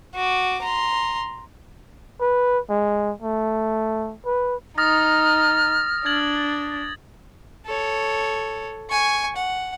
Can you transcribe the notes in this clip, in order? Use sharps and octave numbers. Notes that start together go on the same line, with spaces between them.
F#4 D6
A#5 C6
B4
G#3
A3
B4
D#4 D#6 F6 A6 A#6
D4 G#6 A6 F#7
A4 C#5
G#5 C#6
F#5